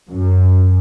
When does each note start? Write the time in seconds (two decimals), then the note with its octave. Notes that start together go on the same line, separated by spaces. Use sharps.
0.11 F#2